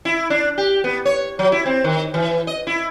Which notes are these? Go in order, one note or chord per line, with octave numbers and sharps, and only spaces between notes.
E4
D4
G4
B3
C#5
F#3
E4
C4
D#3
E3
D#5
E4